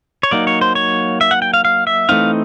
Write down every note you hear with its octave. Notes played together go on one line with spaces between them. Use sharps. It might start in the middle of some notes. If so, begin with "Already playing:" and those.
C#5
F#3 A#3 D#4 D5
C#5
C5
C#5
E5
F#5
G5
F5
F5
E5
E3 A3 C4 D#4 F5